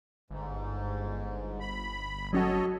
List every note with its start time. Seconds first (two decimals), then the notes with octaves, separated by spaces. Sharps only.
0.30 G1 G#2
1.60 B5
2.33 F#3 C#4 F#4 A4 C#5 D#5